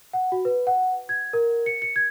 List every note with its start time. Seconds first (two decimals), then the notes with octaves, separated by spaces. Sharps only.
0.13 F#5
0.32 F#4
0.45 B4
0.67 F#5
1.09 G#6
1.33 A#4
1.66 C#7
1.82 C#7
1.96 G#6